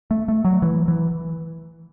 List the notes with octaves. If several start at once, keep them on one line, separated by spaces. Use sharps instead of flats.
A3
A3
F#3
E3
E3